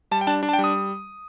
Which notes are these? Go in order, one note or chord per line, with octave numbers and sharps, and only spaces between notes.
G3 A5
G5
D4 A5
D4
A5
G5
G3
D#6